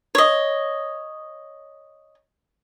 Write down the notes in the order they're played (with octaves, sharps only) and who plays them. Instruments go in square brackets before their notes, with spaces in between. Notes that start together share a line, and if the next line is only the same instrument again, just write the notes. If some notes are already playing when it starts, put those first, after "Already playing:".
[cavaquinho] C#5 D#5